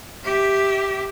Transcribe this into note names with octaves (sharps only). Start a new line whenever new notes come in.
G4 E5